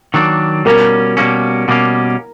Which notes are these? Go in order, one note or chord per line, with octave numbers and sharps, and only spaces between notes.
D#3 F#3 A#3 D4
B2 G3 A#3 C#4 A#4
B2 G3 A#3 C#4
B2 G3 A#3 C#4